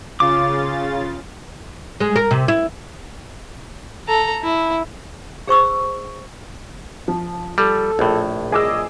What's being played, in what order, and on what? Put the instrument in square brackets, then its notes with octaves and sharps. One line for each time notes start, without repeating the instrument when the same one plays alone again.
[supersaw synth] C#3 F4 A6 [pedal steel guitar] D6
[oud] G#3
A#4
C3
E4
[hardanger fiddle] A4 A#5
E4
[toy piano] G#4 C5 C#6 E6
[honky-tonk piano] F3
[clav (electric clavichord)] G3 [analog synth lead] A4
[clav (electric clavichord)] A#1 A2
[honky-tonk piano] G#4 D6 E6 [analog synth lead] D#5